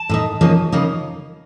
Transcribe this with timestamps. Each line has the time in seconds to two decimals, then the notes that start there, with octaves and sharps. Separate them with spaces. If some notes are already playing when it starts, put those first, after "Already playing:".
Already playing: A5
0.09 A2 A3 D#4
0.41 C#3 F3 A#3 D#4
0.72 C#3 F3 A#3 D#4